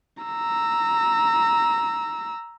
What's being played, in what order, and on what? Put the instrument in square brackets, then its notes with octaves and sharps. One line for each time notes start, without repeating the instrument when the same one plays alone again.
[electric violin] A#5 E6